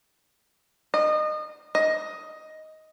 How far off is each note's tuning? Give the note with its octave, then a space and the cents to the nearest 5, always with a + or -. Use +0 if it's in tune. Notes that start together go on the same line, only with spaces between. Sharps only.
D#5 -30
D#5 +10